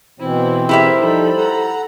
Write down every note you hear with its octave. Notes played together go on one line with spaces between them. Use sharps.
B2 E3 C4 E4 C5
E4 G4 G#4 A#4 E5
F3 G3 D#4 A4 B5
F#5 A#5